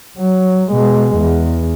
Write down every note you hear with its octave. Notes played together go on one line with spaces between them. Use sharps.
F#3
B2 G#3
E2